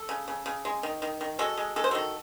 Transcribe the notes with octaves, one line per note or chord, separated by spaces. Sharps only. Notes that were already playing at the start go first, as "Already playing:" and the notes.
Already playing: A4
C#3
C#3
C#3
G#3
D#3
D#3
D#3
G#3 F#4 A4
G#3
G#3 A4
C5
D#3 F#4 A4